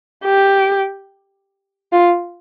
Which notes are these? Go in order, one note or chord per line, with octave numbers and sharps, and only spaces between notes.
G4
F4